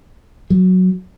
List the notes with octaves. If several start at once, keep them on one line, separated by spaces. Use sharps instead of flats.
F#3